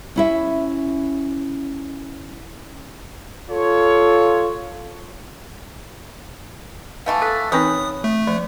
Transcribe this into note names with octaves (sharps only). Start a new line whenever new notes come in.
C#4 E4 E5
F4 A4 C#5
E3 A3 B3 F5 A5
A4 F#6 A6 B6
E3 C4 C#4 D#4 B4 D#6
A3
F3 D5 F#5